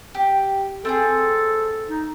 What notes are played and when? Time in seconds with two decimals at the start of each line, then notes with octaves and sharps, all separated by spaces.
0.15 G4
0.85 C4 E4 G#4 A4
1.88 D#4